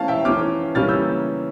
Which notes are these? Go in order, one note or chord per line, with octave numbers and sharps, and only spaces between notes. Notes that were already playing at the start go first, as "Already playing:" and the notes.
Already playing: E3 A3 C#4 F5 A5
E5 G5
E3 A3 C#4 D6 F6
C#3 E3 G3 A#3 C#4 F6 A6
E6 G6